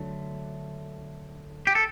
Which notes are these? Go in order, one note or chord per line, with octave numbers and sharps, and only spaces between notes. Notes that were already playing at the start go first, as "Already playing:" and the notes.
Already playing: D3 F#3 A3
G4
A4